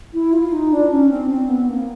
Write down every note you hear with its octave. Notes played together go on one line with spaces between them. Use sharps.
E4
F4
D#4
D4
C#4
C4
C4
B3
A#3